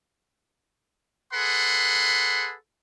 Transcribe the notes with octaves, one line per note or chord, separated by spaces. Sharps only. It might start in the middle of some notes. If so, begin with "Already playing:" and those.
G#4 A4 B4 F#5 B5 C6